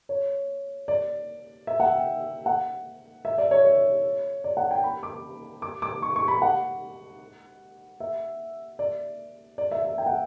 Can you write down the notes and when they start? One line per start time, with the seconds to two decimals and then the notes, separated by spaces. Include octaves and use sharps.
0.09 C#5
0.88 D5
1.67 E5
1.80 F#5
1.93 G5
2.46 F#5
3.25 E5
3.38 D5
3.51 C#5
3.65 C#5
4.44 D5
4.57 F#5
4.71 G5
4.83 B5
5.03 D6
5.62 D6
5.82 D6
6.02 C#6
6.16 C#6
6.28 B5
6.42 F#5
8.00 E5
8.79 D5
9.58 D5
9.71 E5
9.85 E5
9.98 G5
10.06 F#5